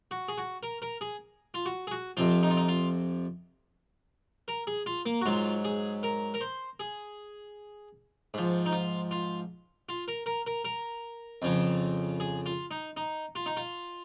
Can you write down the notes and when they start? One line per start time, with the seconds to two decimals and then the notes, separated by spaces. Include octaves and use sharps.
0.11 F#4
0.28 G#4
0.38 F#4
0.63 A#4
0.82 A#4
1.01 G#4
1.54 F4
1.66 F#4
1.87 G#4
1.91 F#4
2.17 F2 C3 F3 F4
2.43 D#4
2.50 F4
2.57 D#4
2.68 F4
4.48 A#4
4.67 G#4
4.86 F4
5.06 A#3
5.21 F#4
5.26 G#2 F#3 F4
5.65 G#4
6.03 A#4
6.34 A#4
6.41 C5
6.80 G#4
8.34 G#2 F3
8.66 D#4
8.72 F4
9.11 F4
9.89 F4
10.08 A#4
10.26 A#4
10.47 A#4
10.65 A#4
11.42 F2 C#3 F3
12.20 G#4
12.46 F4
12.71 D#4
12.97 D#4
13.35 F4
13.46 D#4
13.57 F4